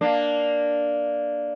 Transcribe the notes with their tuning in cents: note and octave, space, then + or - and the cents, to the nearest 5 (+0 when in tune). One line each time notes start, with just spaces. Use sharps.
A#3 +0 D4 +0